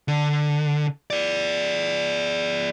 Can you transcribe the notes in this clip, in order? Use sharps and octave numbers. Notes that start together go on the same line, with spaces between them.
D3
G#4 D5